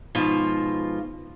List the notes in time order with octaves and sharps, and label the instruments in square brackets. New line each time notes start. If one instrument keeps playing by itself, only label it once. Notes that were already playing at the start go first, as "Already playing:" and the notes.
[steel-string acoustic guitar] G#2 B2 F3 F4